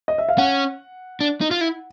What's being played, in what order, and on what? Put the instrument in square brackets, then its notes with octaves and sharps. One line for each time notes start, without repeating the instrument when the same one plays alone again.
[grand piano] D#5
E5
F5
[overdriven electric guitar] C#4 [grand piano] F#5
[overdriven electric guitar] D4
D#4
F4
E4